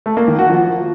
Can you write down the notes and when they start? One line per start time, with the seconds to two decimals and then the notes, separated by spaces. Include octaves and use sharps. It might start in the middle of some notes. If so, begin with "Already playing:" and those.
0.06 A3
0.17 A#3
0.28 D#3
0.39 F#4
0.50 F3